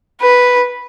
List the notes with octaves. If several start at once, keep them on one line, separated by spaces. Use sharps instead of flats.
B4